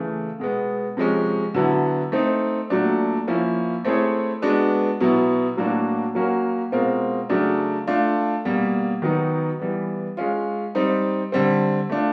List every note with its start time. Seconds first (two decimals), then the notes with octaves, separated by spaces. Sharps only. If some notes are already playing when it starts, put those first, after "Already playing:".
Already playing: C#3 E3 A3
0.39 B2 G#3 B3
0.97 C3 F3 G#3 C#4
1.54 D3 F#3 B3 E4
2.12 A3 C4 D#4
2.70 A#2 F#3 A3 D4
3.28 F3 A#3 C#4 E4
3.85 A3 C4 E4 G#4 C#5
4.42 G#3 B3 D4 F#4 B4
5.00 B2 F#3 B3 E4
5.57 A2 F#3 A#3 D4 F#4
6.15 F#3 A#3 C#4 F#4 A#4
6.72 B2 G#3 C4 F4 A#4
7.30 C#3 F#3 A3 D4
7.87 A3 D4 F4
8.45 B2 G3 A#3
9.02 D#3 F#3 B3 D#4 F#4
9.60 E3 G3 B3
10.17 G#3 C#4 F4
10.75 G3 C4 D#4
11.32 D3 G3 C4
11.90 A3 D4 F4